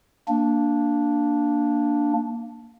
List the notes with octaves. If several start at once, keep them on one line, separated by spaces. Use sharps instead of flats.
A#3 D4